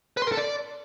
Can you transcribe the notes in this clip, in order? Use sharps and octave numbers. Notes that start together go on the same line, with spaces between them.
B4
C6
A#4
A4
D5